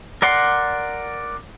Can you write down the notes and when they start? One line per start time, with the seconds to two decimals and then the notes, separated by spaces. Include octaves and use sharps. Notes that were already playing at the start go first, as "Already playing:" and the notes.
0.22 A#4 D5 F#5 C6